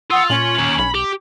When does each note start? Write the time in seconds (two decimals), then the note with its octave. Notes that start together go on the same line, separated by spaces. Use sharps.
0.11 F4 F#5 D#6 E6
0.30 A#2 C#4 F#7
0.58 D#2
0.79 B1 B5
0.95 G4